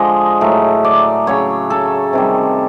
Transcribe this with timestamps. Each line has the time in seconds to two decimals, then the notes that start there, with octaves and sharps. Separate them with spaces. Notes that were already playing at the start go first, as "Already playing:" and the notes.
Already playing: D3 F3 G#3 D#5
0.41 A2 F#3 A3
0.85 D5
1.27 C#3 F#3 A3 C#5
1.70 A4
2.13 C3 D#3 G3